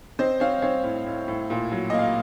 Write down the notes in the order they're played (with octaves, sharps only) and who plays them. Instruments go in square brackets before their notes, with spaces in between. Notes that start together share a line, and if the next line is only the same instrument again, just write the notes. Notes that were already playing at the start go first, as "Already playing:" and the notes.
[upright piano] C4 C5 D#5
C4 C#5 F5
C4 C#5 F5
A2
A2
A2
A#2
F#3
A#3 D#5
F5